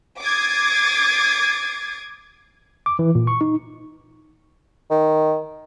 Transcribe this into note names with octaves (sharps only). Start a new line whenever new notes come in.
D6 D#6 G#6 A6 C7
D6
E3
A#2
C#6
D#4
D#3